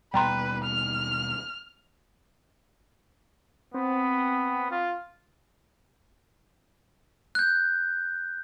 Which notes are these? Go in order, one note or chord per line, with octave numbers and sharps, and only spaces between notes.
D#2 B2 G3 B4 G5 A#5 C6
F6
B3 C4
F4
F#6 G6